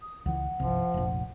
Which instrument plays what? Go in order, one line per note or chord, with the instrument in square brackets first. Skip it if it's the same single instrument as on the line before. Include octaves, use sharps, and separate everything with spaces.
[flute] D#6
[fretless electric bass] C#2 E3 [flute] F#5
[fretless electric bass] G1 C2 [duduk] F3
[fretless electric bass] F1 A#1